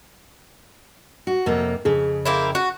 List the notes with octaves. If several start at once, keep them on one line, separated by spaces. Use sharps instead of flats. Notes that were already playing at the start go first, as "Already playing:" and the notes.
F#4
F2 C3 A#3
F2 C#3 G#4
A#3 C4 E4
F#4